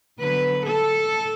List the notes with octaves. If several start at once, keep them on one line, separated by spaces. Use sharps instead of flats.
D3 F#3 B3 B4
A4